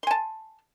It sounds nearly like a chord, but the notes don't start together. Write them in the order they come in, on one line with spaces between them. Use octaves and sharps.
C6 G#5 A5